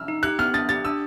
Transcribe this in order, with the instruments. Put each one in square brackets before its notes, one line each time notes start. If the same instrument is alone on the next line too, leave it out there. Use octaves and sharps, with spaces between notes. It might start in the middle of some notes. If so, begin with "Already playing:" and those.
Already playing: [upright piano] E6 F6
[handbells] D#4
[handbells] G4 [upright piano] F#6
[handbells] B3 [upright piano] F6
[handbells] D4 [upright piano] A6
[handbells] G4 [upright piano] A6
[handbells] D4 [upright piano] E6